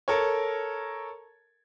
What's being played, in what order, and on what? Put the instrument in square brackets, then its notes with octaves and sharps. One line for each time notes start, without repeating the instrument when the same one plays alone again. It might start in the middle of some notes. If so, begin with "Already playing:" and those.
[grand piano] A4 A#4 C#5